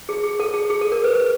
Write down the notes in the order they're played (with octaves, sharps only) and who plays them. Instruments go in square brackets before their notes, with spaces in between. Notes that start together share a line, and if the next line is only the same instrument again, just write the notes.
[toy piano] G#4
G#4
A4
G#4
G#4
A4
A#4
B4
B4